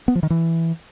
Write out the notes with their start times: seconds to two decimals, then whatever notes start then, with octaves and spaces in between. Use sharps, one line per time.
0.08 B3
0.15 F3
0.23 D#3
0.30 E3